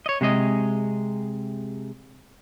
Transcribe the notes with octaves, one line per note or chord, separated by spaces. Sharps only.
C#5 D#5
C3 G#3 G#4 D#5